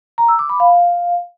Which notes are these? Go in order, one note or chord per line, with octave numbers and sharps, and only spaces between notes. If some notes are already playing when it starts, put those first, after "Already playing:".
A#5
E6
D6
B5
F5